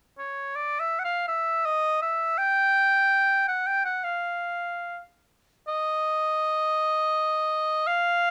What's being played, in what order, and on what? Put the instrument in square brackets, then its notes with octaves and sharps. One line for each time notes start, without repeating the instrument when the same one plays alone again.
[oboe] C#5
D5
E5
F#5
F5
E5
D#5
E5
G5
F#5
G5
F#5
F5
D#5
F5